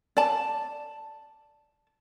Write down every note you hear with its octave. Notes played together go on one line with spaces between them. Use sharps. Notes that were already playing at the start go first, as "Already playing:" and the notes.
D5 A5